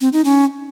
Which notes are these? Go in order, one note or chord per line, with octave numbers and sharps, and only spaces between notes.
C4
D#4
C#4